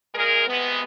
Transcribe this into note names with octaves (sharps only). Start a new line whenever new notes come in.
A#2 G#3 G#4 A#4
C3 G#3 B3